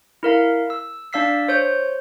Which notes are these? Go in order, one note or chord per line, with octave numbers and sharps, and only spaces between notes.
E4 A#4 F5
E6
D4 D5 F5 E6 B6 C7
C5 C#5 G6